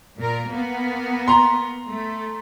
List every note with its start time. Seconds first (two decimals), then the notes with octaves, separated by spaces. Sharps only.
0.19 A#2 A#4
0.49 A#3 B3
1.28 A#5 C6
1.87 A3